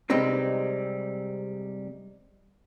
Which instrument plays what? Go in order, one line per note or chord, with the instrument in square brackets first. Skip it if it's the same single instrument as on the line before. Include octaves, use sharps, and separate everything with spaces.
[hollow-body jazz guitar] C3 G3 G#3 C4 D#4 B4